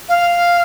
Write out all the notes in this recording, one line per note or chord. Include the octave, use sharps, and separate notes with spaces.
F5